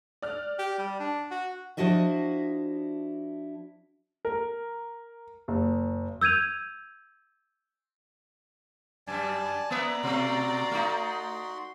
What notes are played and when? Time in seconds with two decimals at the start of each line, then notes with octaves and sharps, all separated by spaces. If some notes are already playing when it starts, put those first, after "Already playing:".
0.22 D5 F6 F#6
0.59 G4
0.79 G3
1.00 D4
1.31 F#4
1.77 F3 D4 E4 F#4 D#5 E5
4.25 A#4
5.48 F#1
6.21 E6 G6 G#6 D#7 F7
9.07 F#2 G3 D5 G#5 A5
9.71 A#3 B3 B4 D5 E5 A#5
10.03 B2 A3 F#4 C6
10.71 A3 D#4